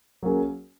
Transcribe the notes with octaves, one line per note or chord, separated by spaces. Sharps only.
F#3 A#3 C#4 G#4